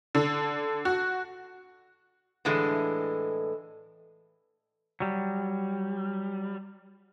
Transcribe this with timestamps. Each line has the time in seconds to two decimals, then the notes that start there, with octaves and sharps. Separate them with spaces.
0.15 D3
0.85 F#4
2.45 A2 D3 E3 G#3
5.00 F#3 G3